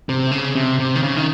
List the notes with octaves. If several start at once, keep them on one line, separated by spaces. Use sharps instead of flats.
C3
C#3
C3
C3
D#3
C#3
D#3